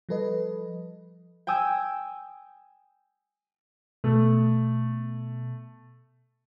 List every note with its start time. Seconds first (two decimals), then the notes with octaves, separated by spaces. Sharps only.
0.09 F3 G3 A4 B4 D#5
1.47 G5 G#5 D#6 E6 G6
4.04 B2 A3